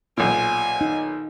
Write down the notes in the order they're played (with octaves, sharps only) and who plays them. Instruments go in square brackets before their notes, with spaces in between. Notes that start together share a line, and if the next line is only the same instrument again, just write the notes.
[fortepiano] B1 A#2 [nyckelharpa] G#5
[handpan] D#4